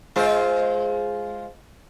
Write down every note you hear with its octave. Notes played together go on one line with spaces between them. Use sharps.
G#3 F4 C5